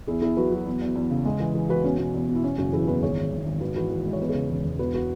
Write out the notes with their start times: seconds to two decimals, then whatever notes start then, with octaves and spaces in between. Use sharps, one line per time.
0.07 E2 E4 G#4
0.22 E2 E4 G#4
0.37 F#3 F#4 B4
0.52 F#3
0.66 E2
0.81 E2
0.95 E2
1.11 C#3
1.25 G#3
1.40 E3
1.54 E3
1.69 E3 F#4 B4
1.84 E2 C#4 F#4
1.98 B2 C#4
2.14 E2
2.28 B2
2.35 E4
2.43 E2 C#4
2.57 F#1 C#4 F#4
2.72 E3 E4 G#4
2.87 E2 F#4 B4
3.02 G#1 G#4 C#5
3.17 G#1
3.32 G#1
3.46 G#1
3.61 G#1 F#4 B4
3.76 E3 F#4 B4
3.90 E3
4.06 G#3
4.13 C#5
4.20 E2 B4
4.29 G#4 C#5
4.35 C#3
4.50 E1
4.64 E1
4.79 E2 F#4 B4
4.94 F#4 B4